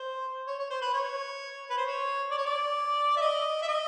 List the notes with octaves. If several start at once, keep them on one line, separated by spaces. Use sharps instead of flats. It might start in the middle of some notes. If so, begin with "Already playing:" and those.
Already playing: C5
C#5
C#5
C5
B4
C#5
B4
C5
C#5
D5
C#5
D5
E5
D#5
E5
D#5